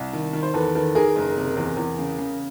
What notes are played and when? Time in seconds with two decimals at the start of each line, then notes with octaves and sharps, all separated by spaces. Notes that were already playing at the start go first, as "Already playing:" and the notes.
Already playing: C2
0.13 D#3
0.33 D#3
0.42 C5
0.54 E2 A4 B4
0.75 D#3 A4 B4
0.95 D#3 G#4 A#4
1.16 F#1
1.37 C3
1.57 E2
1.77 E2
1.98 C#3
2.18 C#3